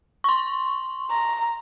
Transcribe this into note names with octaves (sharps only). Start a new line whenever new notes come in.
C6 C#6
A#5